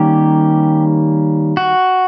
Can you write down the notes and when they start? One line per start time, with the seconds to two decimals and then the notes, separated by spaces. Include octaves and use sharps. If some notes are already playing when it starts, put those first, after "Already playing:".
Already playing: D#3 G3 A#3 C#4 G4
1.57 F#4